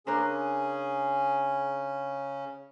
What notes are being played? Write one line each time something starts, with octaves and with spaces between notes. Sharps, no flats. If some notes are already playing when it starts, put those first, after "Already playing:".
C#3 C#4 D4 G#4 A#4 C5